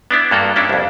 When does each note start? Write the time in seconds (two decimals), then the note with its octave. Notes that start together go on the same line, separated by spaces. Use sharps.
0.11 B3 D4 E4
0.31 G2 A#3 F#4 A4
0.56 C#4 D4 E4
0.69 C2 F2